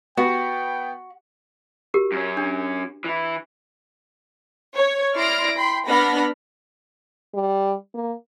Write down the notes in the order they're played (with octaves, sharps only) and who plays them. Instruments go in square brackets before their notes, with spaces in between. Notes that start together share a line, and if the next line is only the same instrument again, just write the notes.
[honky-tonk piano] B3 [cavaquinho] F#4 [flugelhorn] G5
[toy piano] F#4 G4 A#4
[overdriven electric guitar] F#2 C#4
[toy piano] D4
[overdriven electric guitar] E3 E4
[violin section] C#5
E4 D5 C6 F6 A#6 D7
G5 B5 C6
B3 D4 F#5 B5 F6 A#6
[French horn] G3
A#3